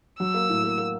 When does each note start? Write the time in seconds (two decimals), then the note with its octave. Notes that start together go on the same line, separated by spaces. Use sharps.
0.19 F#3 E6
0.34 A#3
0.50 A2
0.64 A#3
0.78 A#3